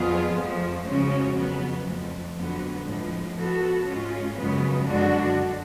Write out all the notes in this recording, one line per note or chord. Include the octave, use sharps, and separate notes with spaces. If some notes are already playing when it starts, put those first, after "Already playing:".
Already playing: F2 F3 B3 F4 G#4
F2 F3 A3
C#3 F3 G#3 C#4 F#4
F2 C#3 F#3 B3
F2 F3 A3
F2 D3 F#3 B3
A2 F3 G#3 B3
F3 B3 F#4 A4
G#2 G#3 C#4 F4
F#2 C#3 F3 G#3 B3
F#2 D3 G#3 D4 F#4